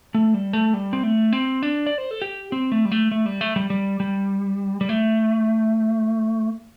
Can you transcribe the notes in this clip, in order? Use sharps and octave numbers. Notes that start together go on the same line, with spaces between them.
A3
G3
A3
G3
C4
A3
C4
D4
D5
C5
A4
G4
C4
A3
G3
A3
A3
G3
A3
G3
G3
G3
G3
A3